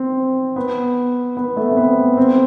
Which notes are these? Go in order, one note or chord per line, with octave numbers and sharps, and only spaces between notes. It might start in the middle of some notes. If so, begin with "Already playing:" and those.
Already playing: C4
B3
B3
A3
C4
B3
C4